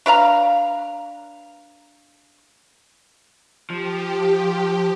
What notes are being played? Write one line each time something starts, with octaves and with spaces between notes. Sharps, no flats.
D4 B4 F5 A#5
F3 G4